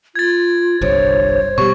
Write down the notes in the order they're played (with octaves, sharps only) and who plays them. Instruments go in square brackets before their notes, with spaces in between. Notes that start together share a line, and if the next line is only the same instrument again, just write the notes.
[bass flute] F4 [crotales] G#6 A6
[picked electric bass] G1 C2 G2 [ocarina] C5 [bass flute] C#5
[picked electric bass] B2 G3 [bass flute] G4 [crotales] C#6